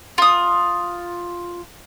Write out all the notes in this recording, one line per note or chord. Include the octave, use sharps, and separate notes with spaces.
F4 D#6